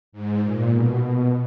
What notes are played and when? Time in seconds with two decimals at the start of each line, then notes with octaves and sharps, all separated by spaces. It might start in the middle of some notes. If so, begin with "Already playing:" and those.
0.12 G#2
0.43 A#2
0.72 B2
1.02 B2